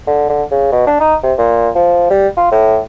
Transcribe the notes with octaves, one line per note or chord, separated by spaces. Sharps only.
D3
D3
C#3
B2
D4
D#4
C3
A#2
F3
G3
F4
A2